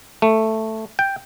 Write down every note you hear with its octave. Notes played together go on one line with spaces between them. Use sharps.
A3
G5